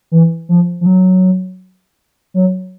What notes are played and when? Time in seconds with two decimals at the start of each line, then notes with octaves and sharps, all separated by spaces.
0.12 E3
0.49 F3
0.81 F3
0.86 F#3
2.34 F#3